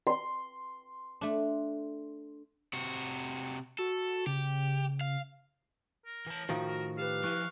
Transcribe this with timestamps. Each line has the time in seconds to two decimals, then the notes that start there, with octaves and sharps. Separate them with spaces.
0.07 C6
1.21 A3 D4
2.73 C3 F#4
3.78 F#4 A4
4.27 C#3 G4
5.01 F5
6.06 A#4
6.26 E3 A5
6.49 A2 D#3 F3 F#4
6.67 A#4
6.98 G4 B4 F5
7.24 F3 E4 C#6 F#6